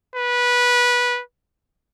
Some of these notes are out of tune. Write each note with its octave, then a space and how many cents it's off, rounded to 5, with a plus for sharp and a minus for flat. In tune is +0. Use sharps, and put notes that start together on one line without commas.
B4 -15